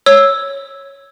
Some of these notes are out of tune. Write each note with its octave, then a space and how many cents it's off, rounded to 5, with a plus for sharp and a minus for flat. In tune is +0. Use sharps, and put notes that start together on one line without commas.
C#5 +0 E6 +0